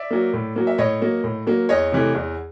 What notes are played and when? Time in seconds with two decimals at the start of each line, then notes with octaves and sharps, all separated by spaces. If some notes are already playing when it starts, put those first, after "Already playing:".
Already playing: D5 E5
0.11 F#3 A#3
0.34 A2
0.56 F#3 A#3
0.67 E5
0.78 A2 C#5 D#5
1.01 F#3 A#3
1.24 A2
1.47 F#3 A#3
1.69 E2 C#5 D#5
1.92 C3 E3 A3
2.15 E2